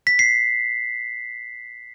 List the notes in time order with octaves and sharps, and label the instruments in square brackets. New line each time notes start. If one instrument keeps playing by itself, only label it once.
[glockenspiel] B6
C7